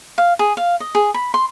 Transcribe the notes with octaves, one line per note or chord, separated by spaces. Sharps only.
F5
G#4
F5
D#5
G#4
B5
C6